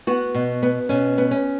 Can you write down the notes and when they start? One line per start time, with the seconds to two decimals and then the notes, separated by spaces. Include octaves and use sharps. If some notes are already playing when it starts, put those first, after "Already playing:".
0.07 B3 F#4
0.35 B2
0.63 B3
0.89 B2 C#4
1.18 B3
1.31 C#4